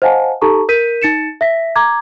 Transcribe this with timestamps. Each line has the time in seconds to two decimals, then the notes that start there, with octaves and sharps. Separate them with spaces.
0.02 C5 D#5 F5 F#5 G#5 A5
0.42 D#4 G4 A4 A5 A#5 C#6
0.69 A#4 G6 B6 D#7
1.02 D#4 A6 C#7 E7
1.41 E5 A#6 B6
1.76 A#5 D6 G#6